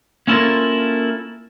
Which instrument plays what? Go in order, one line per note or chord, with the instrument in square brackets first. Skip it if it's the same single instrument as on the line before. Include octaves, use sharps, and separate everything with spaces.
[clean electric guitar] A#3 C#4 E4 F4 A4 A#4